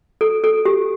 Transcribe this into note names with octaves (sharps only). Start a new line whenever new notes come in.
A4
A4
G4